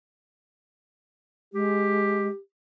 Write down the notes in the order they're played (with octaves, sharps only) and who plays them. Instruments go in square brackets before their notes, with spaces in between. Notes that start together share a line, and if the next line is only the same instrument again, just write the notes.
[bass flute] G#3 [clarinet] G4